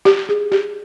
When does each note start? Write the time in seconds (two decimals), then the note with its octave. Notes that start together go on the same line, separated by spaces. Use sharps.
0.05 G4
0.29 G#4
0.52 G4